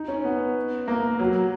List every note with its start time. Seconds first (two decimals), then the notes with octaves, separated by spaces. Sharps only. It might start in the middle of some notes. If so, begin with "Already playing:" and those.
Already playing: D#4
0.08 C#4
0.24 B3
0.88 A#3
1.19 F#3